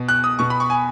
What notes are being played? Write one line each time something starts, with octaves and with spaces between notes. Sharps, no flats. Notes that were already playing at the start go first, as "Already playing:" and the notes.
Already playing: B2
F#6
D#6
B2 C#6
B5
C#6
G#5